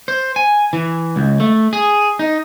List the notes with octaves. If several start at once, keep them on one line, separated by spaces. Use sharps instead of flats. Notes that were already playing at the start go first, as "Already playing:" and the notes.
C5
G#5
E3
C#2
A3
G#4
D#4